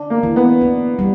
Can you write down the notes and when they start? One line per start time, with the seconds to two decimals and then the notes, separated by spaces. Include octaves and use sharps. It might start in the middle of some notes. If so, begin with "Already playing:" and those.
Already playing: D4
0.10 A#3
0.23 E3
0.36 B3
0.61 D4
0.99 G3